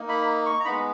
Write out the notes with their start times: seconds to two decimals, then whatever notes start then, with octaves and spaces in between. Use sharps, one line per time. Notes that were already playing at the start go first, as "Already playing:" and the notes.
Already playing: A#3 D#4
0.09 B5
0.46 C#6
0.60 A#5
0.65 G#3 B3 D#4 B5